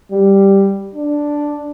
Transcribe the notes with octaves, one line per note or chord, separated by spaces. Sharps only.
G3
D4